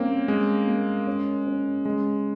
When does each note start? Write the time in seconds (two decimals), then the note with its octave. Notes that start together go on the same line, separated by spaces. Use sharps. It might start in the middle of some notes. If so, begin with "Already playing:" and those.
Already playing: G3 A#3 C4 C#4
0.28 G#3 A#3
0.67 A#3
1.07 C#4
1.47 C#4
1.85 C#3 G#3